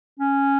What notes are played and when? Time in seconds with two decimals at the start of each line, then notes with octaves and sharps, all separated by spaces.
0.20 C#4